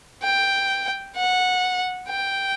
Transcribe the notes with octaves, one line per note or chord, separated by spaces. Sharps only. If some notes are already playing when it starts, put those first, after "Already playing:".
G5
F#5
G5